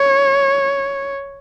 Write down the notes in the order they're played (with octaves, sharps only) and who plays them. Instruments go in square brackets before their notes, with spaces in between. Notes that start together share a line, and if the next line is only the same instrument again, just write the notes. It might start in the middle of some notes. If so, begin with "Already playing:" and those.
Already playing: [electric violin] C#5